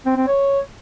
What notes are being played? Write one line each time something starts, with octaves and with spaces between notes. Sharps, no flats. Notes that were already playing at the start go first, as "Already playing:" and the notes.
C4
C4
C#5